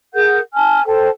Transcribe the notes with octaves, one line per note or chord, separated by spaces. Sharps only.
G#4 A#4 F#5 G6
G#5 A5 F6
A4 C5 G5 A5